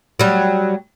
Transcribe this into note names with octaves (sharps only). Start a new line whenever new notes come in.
F#3 G3